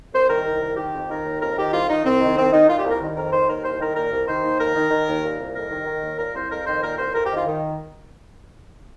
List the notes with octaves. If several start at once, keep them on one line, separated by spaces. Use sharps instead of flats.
C2 C5
D#3 A#4
C2
D#3
D#3 G4
F2
D#3 A#4
D#2
F2 A#4
D#3 G4
C2 F4
D#3 D#4
C2 C4
D#3
C2 C4
D#3 D#4
A#2 F4
G4
C2
A#4
D#3
F2 A#4
D#3 C5
D#2 A#4
C2 C5
D#3 A#4
A#2 A#4
C2
D#3 C5
D#2
F2 A#4
D#3
D#3
D#2
A#2
C2
F2 A#4
D#3
D#3
D#2
A#2 A#4
C2 C5
F2 A#4
D#3 C5
A#2 A#4
C2 C5
F2 A#4
G4
D#3 F4
D#3